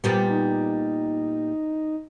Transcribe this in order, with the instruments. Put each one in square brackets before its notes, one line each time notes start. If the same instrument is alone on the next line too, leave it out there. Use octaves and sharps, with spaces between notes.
[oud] A#2 G3 B3
[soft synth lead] D#4